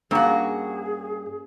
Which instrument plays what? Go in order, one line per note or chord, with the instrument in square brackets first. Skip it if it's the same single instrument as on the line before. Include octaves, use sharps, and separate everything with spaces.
[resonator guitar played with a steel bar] G2 F#4 [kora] A#3 C#4 A#4 [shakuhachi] G#4